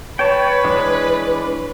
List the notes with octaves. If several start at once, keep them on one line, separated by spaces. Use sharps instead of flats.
B4 C#5 G5 A5
E3 G#3 D4